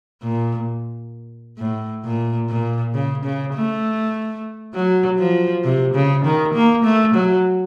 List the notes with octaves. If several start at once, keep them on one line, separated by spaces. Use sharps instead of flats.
A#2
A2
A#2
A#2
C#3
C#3
A3
F#3
F3
C3
C#3
D#3
A#3
A3
F#3